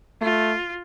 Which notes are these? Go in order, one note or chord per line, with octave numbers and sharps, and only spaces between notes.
A3 F4